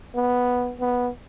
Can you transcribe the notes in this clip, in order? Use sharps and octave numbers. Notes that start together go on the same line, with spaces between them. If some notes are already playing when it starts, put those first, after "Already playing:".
B3
B3